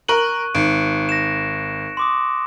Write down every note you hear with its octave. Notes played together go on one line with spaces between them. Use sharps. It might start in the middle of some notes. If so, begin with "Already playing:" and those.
A#4 C#6 F#6 D#7 F#7
G#1 C#7 D7
A#6 E7
C6 D6 D#6